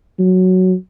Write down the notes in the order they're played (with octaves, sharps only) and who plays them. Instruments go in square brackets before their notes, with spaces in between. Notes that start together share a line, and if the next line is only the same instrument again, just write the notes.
[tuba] F#3